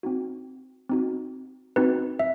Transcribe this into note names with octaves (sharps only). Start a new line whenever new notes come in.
C4 D#4 F#4
C4 D#4 F#4
C4 D#4 F#4 B4
E5